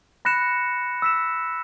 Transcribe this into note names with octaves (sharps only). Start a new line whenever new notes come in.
B5 F#6 A#6 C#7 E7
E6 B6 E7